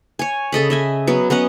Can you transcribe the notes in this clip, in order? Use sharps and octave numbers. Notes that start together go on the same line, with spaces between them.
C#5 G#5
C#3 A4 D#5 B5
D#5 E5 G#5
F#3 B3
B3 C#4 D#5 F#5